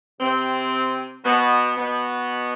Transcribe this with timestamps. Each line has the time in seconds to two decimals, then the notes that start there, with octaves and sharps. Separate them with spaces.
0.20 C3 C4
1.24 B2 B3
1.76 B2 B3